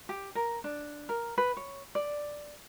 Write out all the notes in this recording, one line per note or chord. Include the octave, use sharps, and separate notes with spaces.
G4
A#4
D4
A#4
B4
C#5
D5